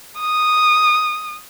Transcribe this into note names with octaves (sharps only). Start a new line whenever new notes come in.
D#6